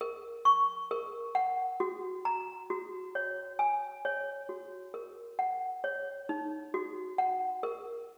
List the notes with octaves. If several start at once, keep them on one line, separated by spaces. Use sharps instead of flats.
A#4
C#6
A#4
F#5
F#4
A#5
F#4
C#5
G#5
C#5
F#4
A#4
F#5
C#5
D#4
F#4
F#5
A#4